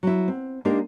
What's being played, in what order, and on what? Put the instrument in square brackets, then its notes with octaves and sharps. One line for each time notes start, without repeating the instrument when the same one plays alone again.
[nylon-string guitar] F#3 E4
C4
G#3 A#3 D4 D#4 G4 A#4